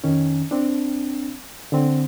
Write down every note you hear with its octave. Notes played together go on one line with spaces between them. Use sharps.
F2 D#3 C#4
C4 D4
D3 C4